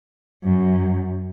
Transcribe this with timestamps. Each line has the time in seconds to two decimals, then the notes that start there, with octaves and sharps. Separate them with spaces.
0.44 F#2